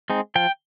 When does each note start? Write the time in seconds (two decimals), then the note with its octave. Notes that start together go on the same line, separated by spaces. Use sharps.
0.10 G#3 C4 D#4
0.35 F3 G5